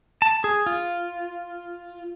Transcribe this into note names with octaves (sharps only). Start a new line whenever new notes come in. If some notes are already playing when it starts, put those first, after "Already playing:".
A5
G#4
F4